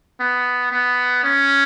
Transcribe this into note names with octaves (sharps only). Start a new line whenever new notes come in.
B3
B3
C#4